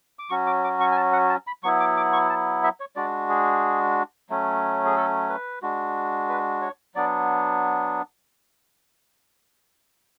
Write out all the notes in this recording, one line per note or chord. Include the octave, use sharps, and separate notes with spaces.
D6
F#3 C#4 F#4 C#6
D6
D6
C#6
G#5
A5
F#5
A5
B5
F#3 B3 E4 C#6
D6
D6
C#6
A5
E5
C#5
G#3 D4 F#4 D5
G#4
F#3 A3 C#4
G#4
A4
B4
G#3 D4 F#4
B4
C#5
F#3 B3 D4 D5